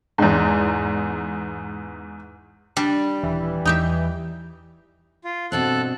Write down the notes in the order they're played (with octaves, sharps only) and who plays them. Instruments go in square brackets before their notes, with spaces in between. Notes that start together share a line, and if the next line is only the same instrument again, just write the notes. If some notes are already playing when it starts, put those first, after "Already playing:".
[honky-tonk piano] E2 G#2
[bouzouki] G3 [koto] D4
[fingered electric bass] D#1 [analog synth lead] E3
[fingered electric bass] E2 [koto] D#4 G4 E5
[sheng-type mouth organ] F4
[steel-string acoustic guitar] G2 B2 C4 [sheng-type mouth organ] A4 F#6